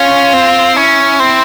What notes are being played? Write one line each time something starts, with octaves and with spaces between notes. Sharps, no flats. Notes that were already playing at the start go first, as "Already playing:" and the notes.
Already playing: C#4 F4
C4
C#4 E4
C4